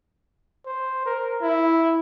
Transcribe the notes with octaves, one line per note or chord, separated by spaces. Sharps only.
C5
A#4
E4